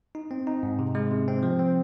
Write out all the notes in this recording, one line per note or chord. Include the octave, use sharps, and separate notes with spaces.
D#4
C4
D#4
G#2
C3
G#3
C3
C4
F3
C4